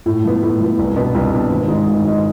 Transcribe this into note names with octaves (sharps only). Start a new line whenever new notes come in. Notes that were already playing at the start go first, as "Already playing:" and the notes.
A2
F3 B3
A2
F3 B3
C2
B2 B3 D4
C2
B2 B3 D4
G#1
G#2 G#3
G#1
G#2 G#3